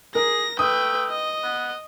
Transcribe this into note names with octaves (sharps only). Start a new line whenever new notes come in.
G#4 A#4 A#6
A3 B4 G5 D#6
D#5
B3